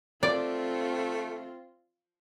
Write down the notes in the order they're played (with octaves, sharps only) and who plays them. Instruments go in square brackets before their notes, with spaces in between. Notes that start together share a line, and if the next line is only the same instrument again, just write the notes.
[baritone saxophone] A3 [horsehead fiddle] C4 F4 [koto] D5